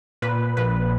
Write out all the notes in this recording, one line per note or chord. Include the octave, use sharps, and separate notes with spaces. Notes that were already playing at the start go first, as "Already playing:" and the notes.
A#2 B4
A#1 B4